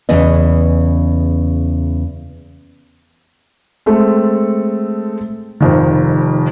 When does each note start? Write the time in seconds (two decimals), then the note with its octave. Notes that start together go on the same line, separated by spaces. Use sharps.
0.09 E2 C#3 B4 D#5
3.86 G#3 A3 C4 A4
5.61 F1 F2 D#3